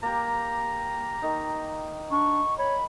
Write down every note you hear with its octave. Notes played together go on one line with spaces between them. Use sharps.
A#3 G4 A#5
D#3 D#4
D4 C#6
C#5 B5